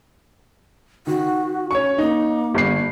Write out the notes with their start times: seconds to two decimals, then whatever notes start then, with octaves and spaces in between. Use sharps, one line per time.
1.07 D#3 F#4
1.71 C#4 C#5 C#6
1.98 A#3 D#4
2.54 G1 C7